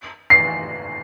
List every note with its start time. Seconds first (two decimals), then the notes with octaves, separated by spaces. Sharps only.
0.30 C7